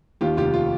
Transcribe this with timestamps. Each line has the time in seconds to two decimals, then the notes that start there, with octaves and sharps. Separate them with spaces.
0.21 D#2 F4 G4
0.37 F1 F4 G4
0.54 F4